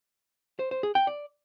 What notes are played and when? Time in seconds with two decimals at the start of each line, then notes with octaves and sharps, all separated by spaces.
0.59 C5
0.71 C5
0.83 G#4
0.95 G5
1.07 D5